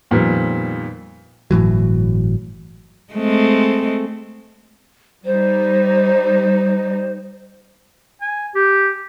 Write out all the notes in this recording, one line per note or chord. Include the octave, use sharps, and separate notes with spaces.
F2 A#2 D#3 F3 G3 B3
G1 A2 E3 F#3
G#3 A3 C4
G3 D#4 C5
G#5
G4